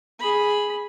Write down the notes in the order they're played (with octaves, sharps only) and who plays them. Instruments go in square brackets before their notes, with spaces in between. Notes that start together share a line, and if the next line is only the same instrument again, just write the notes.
[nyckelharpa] G#4 B5